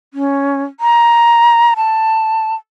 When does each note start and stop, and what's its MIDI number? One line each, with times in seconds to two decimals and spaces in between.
0.14 0.62 61
0.80 1.74 82
1.76 2.55 81